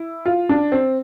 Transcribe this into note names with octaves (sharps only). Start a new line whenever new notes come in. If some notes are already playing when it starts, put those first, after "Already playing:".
Already playing: E4
F4
D4
C4